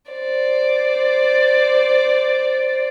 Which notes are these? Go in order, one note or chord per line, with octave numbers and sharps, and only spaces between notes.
C5 D5